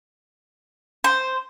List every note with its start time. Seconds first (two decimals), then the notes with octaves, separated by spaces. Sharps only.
1.04 C5